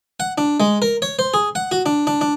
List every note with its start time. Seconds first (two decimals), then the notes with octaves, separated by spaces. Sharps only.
0.20 F#5
0.38 D4
0.60 G#3
0.82 A#4
1.02 C#5
1.19 C5
1.34 G#4
1.55 F#5
1.72 F#4
1.86 D4
2.07 D4
2.21 D4